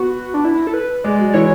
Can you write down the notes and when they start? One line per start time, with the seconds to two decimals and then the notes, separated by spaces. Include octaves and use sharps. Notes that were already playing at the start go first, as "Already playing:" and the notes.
Already playing: B3 F#4
0.34 D4
0.45 E4
0.67 A4
0.74 B4
1.04 G#3 D5
1.19 F#3
1.33 E3 C#5